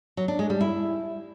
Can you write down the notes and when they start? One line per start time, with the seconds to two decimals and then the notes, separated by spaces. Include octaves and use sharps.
0.17 F#3
0.28 D4
0.39 G#3
0.50 G3
0.61 E4